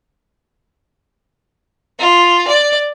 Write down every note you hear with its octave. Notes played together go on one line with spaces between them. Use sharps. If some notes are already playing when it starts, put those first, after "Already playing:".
F4
D5